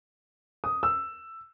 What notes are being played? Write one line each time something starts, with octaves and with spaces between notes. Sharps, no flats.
D#6
E6